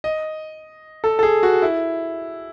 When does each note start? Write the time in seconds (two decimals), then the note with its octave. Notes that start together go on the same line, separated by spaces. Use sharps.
0.04 D#5
1.04 A4
1.19 A4
1.23 G#4
1.43 F#4
1.62 E4